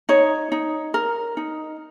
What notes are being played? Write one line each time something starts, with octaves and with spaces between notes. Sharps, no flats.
D#4 C#5
D#4
A#4
D#4